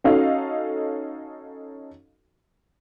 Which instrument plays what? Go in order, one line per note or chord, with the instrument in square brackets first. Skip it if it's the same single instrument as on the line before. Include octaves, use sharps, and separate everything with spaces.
[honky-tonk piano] C#4 D#4 F#4 A4 D#5 F5